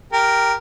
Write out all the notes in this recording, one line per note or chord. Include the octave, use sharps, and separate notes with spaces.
G4 A#4